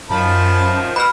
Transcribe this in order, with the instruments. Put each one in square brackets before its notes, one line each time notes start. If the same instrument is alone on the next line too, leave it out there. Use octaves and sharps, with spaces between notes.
[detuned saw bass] F#2 [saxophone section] D#3 F3 [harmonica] A5 B5
[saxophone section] B2 [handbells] B5 F6